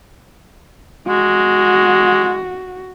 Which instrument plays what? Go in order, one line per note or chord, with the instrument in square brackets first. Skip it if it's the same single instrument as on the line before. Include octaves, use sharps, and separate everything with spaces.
[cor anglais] G#3 [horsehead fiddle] F#4